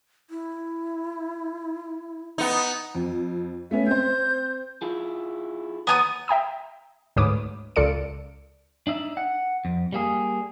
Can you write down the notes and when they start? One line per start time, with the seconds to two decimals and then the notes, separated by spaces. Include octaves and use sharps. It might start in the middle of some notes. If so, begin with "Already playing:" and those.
0.30 E4
2.38 B3 D#4
2.95 F2
3.71 A3 B3 C#4 E5
3.87 C4 C5 G6
4.82 E4 F4 G#4
5.87 D#2 B3 C#5 G#5 A#5 D#6
6.28 E5 G5 A#5 D#6
7.16 D2 G#2 B4 C#5 D6 D#6
7.76 C#2 F4 A4 D5 C#7 D7
8.87 D4 D#4 E5
9.17 F#5
9.65 F2
9.93 G3 A#3 G#4